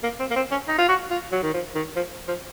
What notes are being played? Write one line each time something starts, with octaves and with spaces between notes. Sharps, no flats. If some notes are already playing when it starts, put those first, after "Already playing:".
A#3
C4
A#3
C4
C#4
D#4
F4
F#4
F4
F#3
D#3
F3
D#3
F3
F3